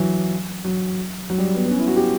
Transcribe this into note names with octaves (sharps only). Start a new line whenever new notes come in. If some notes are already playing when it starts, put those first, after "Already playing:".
Already playing: E3 F#3
F#3
F#3
G3
B3
B3
C#4
E4
F#4
G4